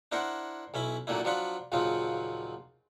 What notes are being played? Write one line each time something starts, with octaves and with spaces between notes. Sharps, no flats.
D4 E4 A#4 C5 F#5
B1 C#4 E4 B5
A#2 F#3 A3 A#3 D4 E4
F3 F#3 D4 F4 F#5 B5
A#1 D#2 C#3 F3 F#3 F4